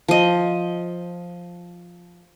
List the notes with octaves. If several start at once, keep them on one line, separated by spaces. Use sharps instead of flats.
F3 D#5